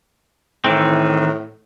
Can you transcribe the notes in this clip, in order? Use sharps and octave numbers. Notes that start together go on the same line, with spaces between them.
A2 D#3 E3 C4